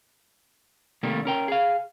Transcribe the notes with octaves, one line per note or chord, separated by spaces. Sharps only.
C3 D#3 G3 A3 A#3
C#4 A#4 G5
G#4 F5